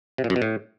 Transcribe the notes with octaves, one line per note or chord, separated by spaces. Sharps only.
C3
A#2
F#2
B2
A2